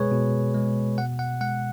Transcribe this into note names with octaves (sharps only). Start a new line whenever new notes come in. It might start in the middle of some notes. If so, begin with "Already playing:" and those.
Already playing: B2 G#3 G#4 B4 C#5
B2
G#3
B2 F#5
F#5
G#3 F#5